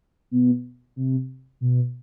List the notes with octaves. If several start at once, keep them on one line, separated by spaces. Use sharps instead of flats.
B2
C3
B2